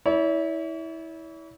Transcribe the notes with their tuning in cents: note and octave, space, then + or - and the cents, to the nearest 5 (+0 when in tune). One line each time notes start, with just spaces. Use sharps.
E4 -20 C#5 +45